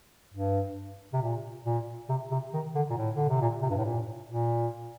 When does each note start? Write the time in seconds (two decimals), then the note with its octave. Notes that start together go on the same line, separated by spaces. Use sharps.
0.34 G2
1.13 C3
1.22 A#2
1.65 A#2
2.09 C3
2.31 C3
2.53 D#3
2.75 D3
2.90 A#2
2.97 A2
3.15 D3
3.29 C3
3.41 A#2
3.62 C3
3.70 G2
3.77 A2
3.85 A#2
4.29 A#2